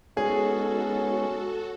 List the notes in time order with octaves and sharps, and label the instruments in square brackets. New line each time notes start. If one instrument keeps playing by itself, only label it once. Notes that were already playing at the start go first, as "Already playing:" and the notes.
[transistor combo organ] G#3 B3 D#4 [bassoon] C#4 [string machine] F#4 A4 [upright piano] G#4